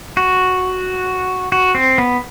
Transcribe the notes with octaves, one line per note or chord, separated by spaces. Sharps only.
F#4
F#4
C4
B3